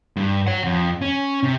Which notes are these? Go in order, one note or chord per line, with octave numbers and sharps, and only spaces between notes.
G2
C#5 F#5
F2
C#4
C3